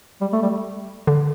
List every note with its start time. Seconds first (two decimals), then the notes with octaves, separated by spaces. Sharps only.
0.21 G3
0.33 A3
0.43 G3
1.07 D3